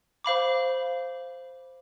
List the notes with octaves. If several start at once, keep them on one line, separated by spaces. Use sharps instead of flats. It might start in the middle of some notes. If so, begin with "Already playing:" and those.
C5 F5 B5 D6